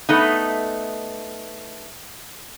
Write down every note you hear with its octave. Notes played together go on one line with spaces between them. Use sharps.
A3 B3 D#4